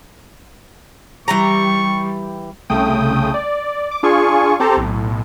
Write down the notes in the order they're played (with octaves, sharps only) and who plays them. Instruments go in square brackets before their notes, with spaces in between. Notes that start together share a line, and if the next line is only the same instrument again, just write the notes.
[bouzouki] E3 G4 A#5 [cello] G3 [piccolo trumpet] C#6
[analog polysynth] C2 C#3 A3 G5 D#6
D5
D6
D4 F4 G#4 G#5 C#6
C4 G4 A4 C5 A#5
B1 A2